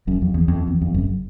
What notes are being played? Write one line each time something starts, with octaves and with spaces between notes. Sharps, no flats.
F#1 F#2
F2
E2
F2
E2
F2
F#1 F#2